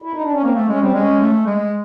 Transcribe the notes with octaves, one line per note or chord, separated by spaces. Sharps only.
E4
D#4
D4
C#4
A#3 C4
A3
G#3 C#4
G3 C4
G#3 C#4
A3
G#3